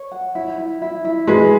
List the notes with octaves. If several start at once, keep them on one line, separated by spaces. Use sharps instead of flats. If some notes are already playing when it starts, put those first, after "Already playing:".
Already playing: C#5
F#5
E4
E4
E4
E4
G#3 B4